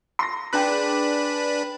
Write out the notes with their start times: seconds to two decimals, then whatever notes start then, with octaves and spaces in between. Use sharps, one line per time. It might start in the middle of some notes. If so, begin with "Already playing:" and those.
0.19 C6 A#6
0.53 D4 G#4 B4 D5 G5 B5 F#6